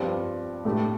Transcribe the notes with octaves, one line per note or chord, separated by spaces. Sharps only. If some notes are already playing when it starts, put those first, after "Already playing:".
Already playing: G2 F3 C4 G4
A2 A3 D4 G4